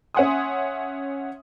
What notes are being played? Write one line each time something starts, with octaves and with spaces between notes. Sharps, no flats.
C#4 E5 F#5 G#5 C6 D#6